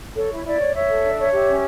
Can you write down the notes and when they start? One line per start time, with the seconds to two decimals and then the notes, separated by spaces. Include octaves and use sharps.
0.15 A4 C#5
0.30 E4
0.44 E4 D5
0.59 C#5
0.73 C#5 E5
0.89 A4
1.03 D4
1.17 C#5
1.32 G4 E5
1.47 C#4